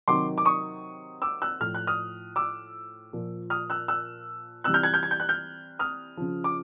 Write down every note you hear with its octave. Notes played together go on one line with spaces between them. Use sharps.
C3 D#3 F#3 C6 D6
D6
C#6 D#6
D6 E6
E6 F#6
A2 F3 F6
F#6
D#6 F6
D6 E6
A#2 F3
D#6 F6
E6 F#6
E6 F#6
C3 E3 G3 E6 F#6
F6 G6
F#6 G#6
F6 G6
G#6
G6
F#6
F6 G6
D#6 F6
C#3 F3
D6